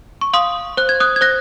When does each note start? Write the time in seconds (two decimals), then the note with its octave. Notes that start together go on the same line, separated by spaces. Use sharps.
0.21 C#6
0.33 F5 C6 D#6
0.77 C5 F#6
0.89 G#6
1.00 D#6 F#6
1.16 G#6
1.21 C5 F#6 A#6